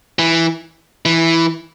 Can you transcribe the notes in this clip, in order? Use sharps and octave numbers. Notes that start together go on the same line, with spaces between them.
E3
E3